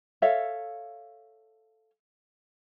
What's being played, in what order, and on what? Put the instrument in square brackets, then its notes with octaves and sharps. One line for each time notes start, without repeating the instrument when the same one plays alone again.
[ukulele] A4 C#5 E5 F5